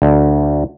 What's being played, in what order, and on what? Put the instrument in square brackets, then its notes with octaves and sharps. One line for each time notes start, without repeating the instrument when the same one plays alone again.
[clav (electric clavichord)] D2